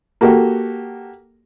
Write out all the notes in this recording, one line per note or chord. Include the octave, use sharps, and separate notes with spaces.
A#3 F#4 G4 A4